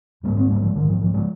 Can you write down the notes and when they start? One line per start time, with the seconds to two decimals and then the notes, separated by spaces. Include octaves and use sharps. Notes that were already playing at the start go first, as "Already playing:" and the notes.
0.23 G#2 G3 A#3
0.36 G#3 C4
0.50 G3 A#3
0.62 F3 G#3
0.75 G#2 D#3
0.88 F3
1.01 F3
1.14 F3 G#3